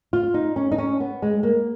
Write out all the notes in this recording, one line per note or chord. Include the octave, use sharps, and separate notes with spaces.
F4
D#4
C#4
D#4
C#4
B3
G#3
A#3